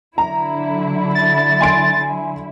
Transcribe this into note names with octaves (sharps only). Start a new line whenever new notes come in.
D3 F#3 E4 A#5
A6
G#5 C6 D7